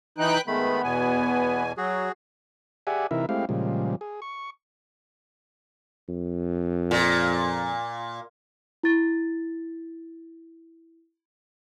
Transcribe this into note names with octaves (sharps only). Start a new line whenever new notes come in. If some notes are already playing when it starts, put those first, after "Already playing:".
E3 D#4 B4 G5 F#6
D#3 G#3 A3 B3 B5
E2 B2 G#5
F#3 F#4 G#4
G4 G#4 D5 E5 F#5 G#5
C3 E3 D#4 E4 A#4 E5
G#3 A3 C4 E4 G4 F5
A#2 C#3 F3 G3 G#3
G#4
C#6
F2
A#2
E4 A6